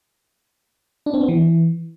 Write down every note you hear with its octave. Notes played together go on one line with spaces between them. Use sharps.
D4
C4
B3
E3